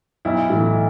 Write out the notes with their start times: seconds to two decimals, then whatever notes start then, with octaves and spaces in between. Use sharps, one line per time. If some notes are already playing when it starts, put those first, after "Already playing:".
0.25 B1 E4
0.50 A2 E3